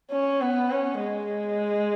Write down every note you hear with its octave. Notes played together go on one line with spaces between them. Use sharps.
C#4
B3
C#4
G#3